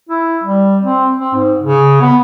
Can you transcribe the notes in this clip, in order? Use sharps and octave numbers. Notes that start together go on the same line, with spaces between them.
E4
G3
C4
C4
G#2
C#3
B3